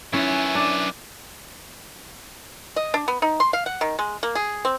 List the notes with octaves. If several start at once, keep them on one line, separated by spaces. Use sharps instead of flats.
F#2 B3 C#4 E4
D4
D#5
D4
B3
D#4
C6
F5
F#5
D#3
G#3
A#3
G#4
C4